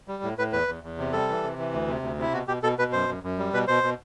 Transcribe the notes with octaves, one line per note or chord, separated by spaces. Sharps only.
G3
A2
A2 B4
E2 B4
E2
E2
C3
G3 A4
E3
C3
E3
D2
C3
D2
C3 E4
B2 F#4
B2 G4
B2 A4
B2 B4
F#2 C5
F#2
F#2
G3
B2 B4
B2 C5
B2